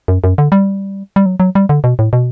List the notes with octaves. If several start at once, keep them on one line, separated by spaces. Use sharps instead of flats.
F#2
F#2
D3
G3
G3
F#3
F#3
G3
D3
B2
A2
B2